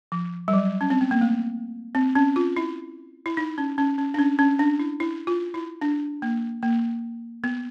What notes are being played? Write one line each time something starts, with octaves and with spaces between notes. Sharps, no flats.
F3
G3
F#3
C#4
C4
B3
A#3
A3
C4
C#4
F4
E4
E4
D#4
C#4
C#4
C#4
D4
C#4
C#4
D4
E4
E4
F4
E4
D4
A#3
A#3
B3